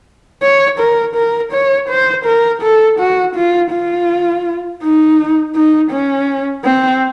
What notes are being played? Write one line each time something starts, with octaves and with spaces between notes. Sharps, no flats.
C#5
A#4
A#4
C#5
C5
A#4
A4
F#4
F4
F4
D#4
D#4
C#4
C4